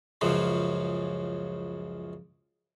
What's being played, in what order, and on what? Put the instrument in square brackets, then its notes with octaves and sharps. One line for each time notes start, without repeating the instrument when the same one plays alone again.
[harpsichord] C#2 F#2 C#3 F3